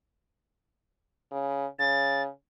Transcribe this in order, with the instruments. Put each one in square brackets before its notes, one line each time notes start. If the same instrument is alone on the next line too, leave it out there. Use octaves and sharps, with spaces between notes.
[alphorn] C#3
[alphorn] C#3 [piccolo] A6